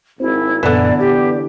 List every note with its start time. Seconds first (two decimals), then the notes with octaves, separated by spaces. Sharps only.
0.20 G#1 C4 E4
0.63 F#2 A#2 D3 E3 B3 D5
0.99 G4 D5